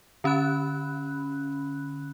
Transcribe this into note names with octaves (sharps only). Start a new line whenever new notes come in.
D3 C#4 B5 F#6